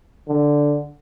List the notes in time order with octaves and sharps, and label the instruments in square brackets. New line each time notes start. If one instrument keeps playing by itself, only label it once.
[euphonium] D3